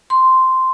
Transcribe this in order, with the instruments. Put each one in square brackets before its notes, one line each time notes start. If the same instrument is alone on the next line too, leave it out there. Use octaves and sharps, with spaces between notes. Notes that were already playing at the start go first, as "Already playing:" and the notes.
[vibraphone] C6